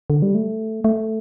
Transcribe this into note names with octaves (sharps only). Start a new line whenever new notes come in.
D3
G3
A3
A3